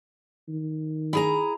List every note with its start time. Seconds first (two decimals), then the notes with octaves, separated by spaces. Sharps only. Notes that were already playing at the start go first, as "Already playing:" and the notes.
0.48 D#3
1.13 E4 G#4 A#5